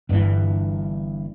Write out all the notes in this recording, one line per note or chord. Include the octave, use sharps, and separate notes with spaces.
G1 G2 C3 E3